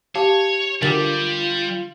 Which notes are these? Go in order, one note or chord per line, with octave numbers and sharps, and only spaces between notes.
G4 C#5 F5 A5
D3 G3 F4 G4 A#4 A6 F#7